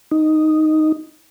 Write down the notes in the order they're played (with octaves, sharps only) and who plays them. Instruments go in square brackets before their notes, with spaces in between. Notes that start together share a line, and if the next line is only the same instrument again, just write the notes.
[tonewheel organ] D#4